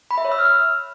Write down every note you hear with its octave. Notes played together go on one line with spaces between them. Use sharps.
B5
E5
C#5
E6
F6